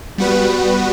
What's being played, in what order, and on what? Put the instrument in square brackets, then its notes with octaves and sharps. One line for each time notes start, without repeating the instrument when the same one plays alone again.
[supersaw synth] G3 B3 F#4 B4